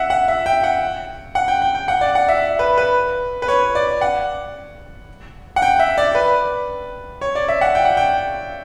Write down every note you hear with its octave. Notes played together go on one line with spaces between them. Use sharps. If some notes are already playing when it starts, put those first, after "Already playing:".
Already playing: E5 F#5
F#5
E5
G5
F#5
F#5
G5
G5
G5
F#5
D5
F#5
E5
B4
B4
B4
C#5
D5
F#5
F#5
G5
E5
D5
B4
C#5
D5
E5
F#5
G5
F#5
G5